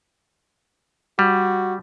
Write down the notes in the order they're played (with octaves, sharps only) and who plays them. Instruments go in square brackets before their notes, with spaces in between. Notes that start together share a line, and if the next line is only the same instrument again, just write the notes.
[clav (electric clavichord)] G3 [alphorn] F#4